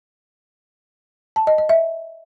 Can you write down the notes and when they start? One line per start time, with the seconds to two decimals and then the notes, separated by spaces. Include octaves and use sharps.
1.36 A5
1.47 D#5
1.58 D#5
1.69 E5